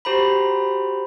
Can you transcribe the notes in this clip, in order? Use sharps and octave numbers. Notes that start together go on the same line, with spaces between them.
F#4 G4 C5 A#5 B5